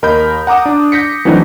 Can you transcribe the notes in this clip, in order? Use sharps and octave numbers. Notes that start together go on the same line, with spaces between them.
D#2 A#4 D#5 B5 G6
F#5 A#5 D6 D#6
D4
G6 A#6 B6 C#7
E3 F#3 A3 C4 D4 D#4